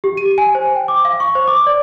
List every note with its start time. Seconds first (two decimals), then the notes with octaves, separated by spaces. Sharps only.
0.04 G4
0.17 D#7
0.38 G#5
0.55 C5
0.75 G5
0.88 D6
1.05 F5
1.20 C#6
1.35 C5
1.48 D6
1.67 D5